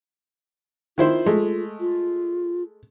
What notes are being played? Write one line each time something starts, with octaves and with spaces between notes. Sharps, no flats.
D#3 E4 F4 C5
G#3 A3
F4